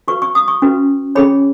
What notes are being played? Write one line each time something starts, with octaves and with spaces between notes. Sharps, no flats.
F#4 B4 C#6
C#6
D#6
C#6
C#4 F#4 B4
C#4 G#4 C#5 B5